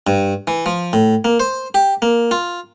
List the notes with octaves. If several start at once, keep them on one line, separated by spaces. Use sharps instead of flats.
G2
E3
F3
A2
A#3
C5
G4
A#3
F4